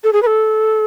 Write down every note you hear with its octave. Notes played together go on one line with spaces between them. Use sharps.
A4
G#4
B4
A4